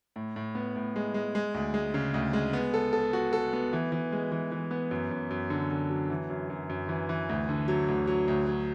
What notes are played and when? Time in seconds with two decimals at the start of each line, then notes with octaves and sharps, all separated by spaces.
0.16 A2
0.36 A2
0.55 B3
0.76 A2
0.96 G#3
1.14 G#3
1.35 G#3
1.54 D2
1.74 G#3
1.94 C#3
2.14 D2
2.33 G#3
2.53 B3
2.74 A4
2.93 A4
3.13 F#4
3.33 A4
3.53 B3
3.73 E3
3.92 E3
4.12 G#3
4.32 E3
4.52 E3
4.71 B3
4.91 F#2
5.11 F#2
5.31 F#2
5.50 D3
5.71 D3
5.90 F#3
6.10 E3
6.30 F#2
6.50 F#2
6.70 F#2
6.89 E3
7.09 E3
7.29 D2
7.49 D3
7.68 F#3
7.88 D2
8.07 F#3
8.28 D2
8.47 F#3